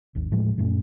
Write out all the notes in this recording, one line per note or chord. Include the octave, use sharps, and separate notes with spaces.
G#1 D#2
A2 F3 G#3
F#2 A#2 A3 C#4